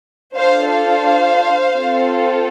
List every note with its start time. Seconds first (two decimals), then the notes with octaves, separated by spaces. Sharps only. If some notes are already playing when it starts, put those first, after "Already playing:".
0.36 D4 F4 A4 C5 F5
0.71 C5 F5
1.74 C4 F4 A4